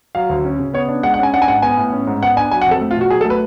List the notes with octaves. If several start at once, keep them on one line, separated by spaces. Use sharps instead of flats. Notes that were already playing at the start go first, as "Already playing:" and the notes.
F#3 F5
D2
C#4
C#3
B3 C#5
D4
G#3 F#5
F#5
C#4 G#5
D4 F#5
G#5
G#2 F#5
B3 G#5
A2
C#4
G#2
B3 F#5
D4 G#5
F#3 G#5
F#5
F2 A4
A3
F4
B2 F#4
F#3 G#4
A4
A3
B4